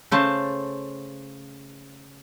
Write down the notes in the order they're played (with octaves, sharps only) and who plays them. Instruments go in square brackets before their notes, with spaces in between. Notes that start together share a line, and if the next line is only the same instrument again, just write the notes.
[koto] C#3 A3 C5 A5